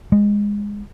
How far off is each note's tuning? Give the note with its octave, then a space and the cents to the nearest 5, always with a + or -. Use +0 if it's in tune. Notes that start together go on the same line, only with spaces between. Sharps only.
G#3 -15